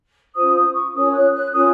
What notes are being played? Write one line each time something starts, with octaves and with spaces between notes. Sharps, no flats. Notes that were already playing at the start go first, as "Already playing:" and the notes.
C#4 F4 C5 D#6
D#6
C#6
C#4 F4 A#4 C#5 D#6
F#6
F#6
C#4 F4 A#4 C#5 D#6